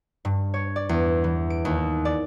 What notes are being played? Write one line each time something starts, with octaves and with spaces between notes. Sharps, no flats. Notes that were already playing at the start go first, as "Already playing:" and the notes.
G2
C#5
D5
E2
E3
D7
D#2
D5